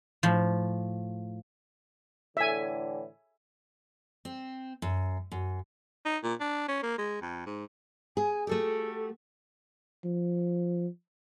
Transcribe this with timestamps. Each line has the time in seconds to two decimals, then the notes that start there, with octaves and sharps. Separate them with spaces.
0.23 A2 F3
2.37 A2 D3 E3 E5 G#5
4.25 C4
4.82 F#2
5.32 F#2
6.05 D#4
6.23 A#2
6.40 D4
6.68 C#4
6.83 A#3
6.98 G#3
7.22 F2
7.46 G#2
8.17 G#4 G#5
8.47 A3 F#4 G4 A4
10.04 F3